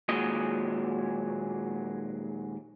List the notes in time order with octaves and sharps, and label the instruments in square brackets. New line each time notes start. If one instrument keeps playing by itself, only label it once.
[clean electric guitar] D#2 A#2 F#3 G#3 D#5